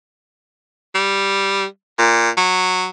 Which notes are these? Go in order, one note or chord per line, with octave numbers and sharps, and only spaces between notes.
G3
A#2
F#3